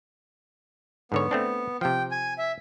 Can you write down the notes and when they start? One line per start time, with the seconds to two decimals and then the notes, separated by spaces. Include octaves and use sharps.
1.12 G#2 D3 B3 C#5
1.31 A3 C4 D4
1.81 C3 F3 G5
2.11 G#5
2.38 E5